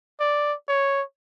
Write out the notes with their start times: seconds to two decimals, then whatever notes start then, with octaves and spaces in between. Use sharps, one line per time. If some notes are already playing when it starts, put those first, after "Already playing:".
0.20 D5
0.68 C#5